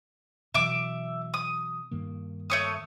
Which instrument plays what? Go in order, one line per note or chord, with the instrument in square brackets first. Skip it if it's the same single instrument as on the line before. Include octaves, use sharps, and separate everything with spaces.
[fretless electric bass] B2 E3 F#3 [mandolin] E5 D6
[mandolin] D#6
[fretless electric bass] G2 D#3 A#3
[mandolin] A3 C#5 D#6